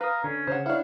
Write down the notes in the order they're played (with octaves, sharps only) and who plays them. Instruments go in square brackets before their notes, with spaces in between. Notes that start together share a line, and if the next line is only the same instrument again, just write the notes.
[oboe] A#4 [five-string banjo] B4 [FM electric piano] F5 D#6
[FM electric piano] D3 [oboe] C#4
[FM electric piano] C#3 [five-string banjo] C5 C#5 F#5
[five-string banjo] D4 F#5 [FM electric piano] E4 C#5 [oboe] F5